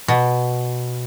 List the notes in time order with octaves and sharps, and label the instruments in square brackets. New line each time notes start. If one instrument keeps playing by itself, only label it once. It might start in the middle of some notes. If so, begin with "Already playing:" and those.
[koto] B2